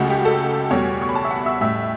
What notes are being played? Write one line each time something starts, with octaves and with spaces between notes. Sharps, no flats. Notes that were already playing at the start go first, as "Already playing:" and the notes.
Already playing: C#2 C#3 F#3 A3 F#4
G4
A4
E2 B2 G3 C#5
C#6
B5
A5
E5
F#5
E5
A1 A2 G3 E5